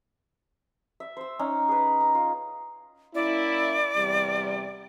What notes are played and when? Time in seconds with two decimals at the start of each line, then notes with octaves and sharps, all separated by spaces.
1.00 E5
1.17 C5 E6
1.39 C#4 D#4
1.69 G#4 B4
2.00 A#5
2.15 F4
3.15 A#3 C#4 E4 D5
3.97 E2 C3 G3